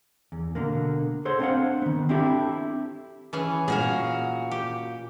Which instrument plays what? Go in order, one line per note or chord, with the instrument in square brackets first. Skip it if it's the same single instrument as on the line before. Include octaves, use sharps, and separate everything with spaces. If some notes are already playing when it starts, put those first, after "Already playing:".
[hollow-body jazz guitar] E2
B2 D3 A#3
G#4 A4 C5 C#5 F#5
C4 D4 C5 D5 F5 F#5
D#3 B3
C4 D4 E4 G4 A4
[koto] E3 C#4 G#4
[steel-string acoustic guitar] A#2 F#4 F5 [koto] G#4
[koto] G4